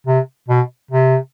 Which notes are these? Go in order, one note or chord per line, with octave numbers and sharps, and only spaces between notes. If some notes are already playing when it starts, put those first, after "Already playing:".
C3
B2
C3